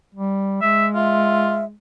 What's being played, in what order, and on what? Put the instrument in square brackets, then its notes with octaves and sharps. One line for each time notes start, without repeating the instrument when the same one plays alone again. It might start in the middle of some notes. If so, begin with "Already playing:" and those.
[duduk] G3
[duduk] G#3 [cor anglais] E5
[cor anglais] F4 [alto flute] E5